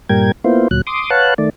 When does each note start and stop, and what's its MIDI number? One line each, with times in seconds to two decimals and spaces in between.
0.09 0.32 43
0.09 0.32 46
0.09 0.32 55
0.09 0.32 70
0.09 0.32 79
0.09 0.32 92
0.44 0.68 58
0.44 0.68 59
0.44 0.68 64
0.44 0.68 65
0.44 0.68 72
0.71 0.81 38
0.71 0.81 46
0.71 0.81 54
0.71 0.81 90
0.87 1.10 84
0.87 1.10 86
0.87 1.10 87
1.10 1.34 71
1.10 1.34 73
1.10 1.34 77
1.10 1.34 78
1.10 1.34 81
1.10 1.34 90
1.38 1.50 51
1.38 1.50 57
1.38 1.50 74